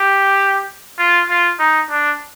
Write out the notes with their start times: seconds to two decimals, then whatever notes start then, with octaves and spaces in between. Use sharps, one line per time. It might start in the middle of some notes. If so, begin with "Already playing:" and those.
Already playing: G4
0.99 F4
1.29 F4
1.59 D#4
1.90 D4